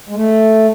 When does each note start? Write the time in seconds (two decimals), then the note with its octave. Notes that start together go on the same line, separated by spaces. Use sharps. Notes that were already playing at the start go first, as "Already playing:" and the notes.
0.09 G#3
0.15 A3